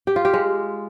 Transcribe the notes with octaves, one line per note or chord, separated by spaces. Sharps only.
G4
F4
G4
G#3